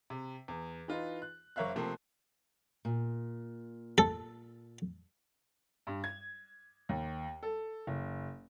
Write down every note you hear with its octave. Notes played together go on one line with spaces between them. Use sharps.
C3
E2
E3 D#4 F4 B4
F#6
F#1 A#4 C#5 E5 F5 F#6
C3 F3 A3 A#3 C4
A#2
A4
G2
G#6
D#2
A4
F#1